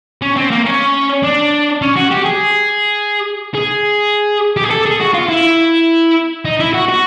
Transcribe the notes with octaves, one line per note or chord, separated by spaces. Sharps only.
C#4
C4
A#3
C#4
D4
C#4
F#4
G4
G#4
G#4
G4
G#4
A4
G#4
F#4
F4
E4
D#4
E4
F#4
F#4